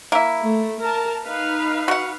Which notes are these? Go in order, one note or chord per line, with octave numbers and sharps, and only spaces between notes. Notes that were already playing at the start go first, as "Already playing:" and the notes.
A#3 E4
A3
A#4 A5
D#4 B4 F5
F#4 F#5